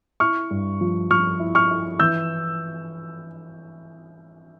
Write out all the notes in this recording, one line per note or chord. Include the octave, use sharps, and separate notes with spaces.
E4 C#6 F6
G2
F3
F3 C#6 F6
E4
C#6 F6
E4
E3 E6 G6